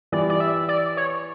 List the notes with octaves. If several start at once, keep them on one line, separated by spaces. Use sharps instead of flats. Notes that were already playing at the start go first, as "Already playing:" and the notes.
E3 G3 D5
D5
E5
D5
C#5